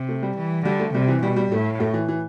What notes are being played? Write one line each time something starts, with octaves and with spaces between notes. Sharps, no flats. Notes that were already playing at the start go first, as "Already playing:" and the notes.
Already playing: C3
A3
G3
E3
D3 G3
A3
C3 G3
E3
B2 G3
G3
A2 A3
A3
E3
E3